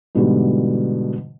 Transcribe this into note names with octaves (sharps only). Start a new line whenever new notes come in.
G#2 B2 D3 E3 G3 F#4